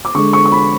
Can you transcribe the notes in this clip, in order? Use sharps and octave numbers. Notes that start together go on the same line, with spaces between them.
D6
D3 G#3 C#6
C#6
C#6
B5